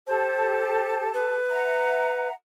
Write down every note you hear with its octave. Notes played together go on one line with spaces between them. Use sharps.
G4 A4 C5 A5
B4
E5 F#5 A#5